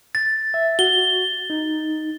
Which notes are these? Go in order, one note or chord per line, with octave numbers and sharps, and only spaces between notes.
A6
E5
F#4 G7
D#4